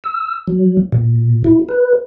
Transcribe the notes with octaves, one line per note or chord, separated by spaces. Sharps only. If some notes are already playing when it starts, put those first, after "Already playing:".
E6
F#3
A#2
E4
B4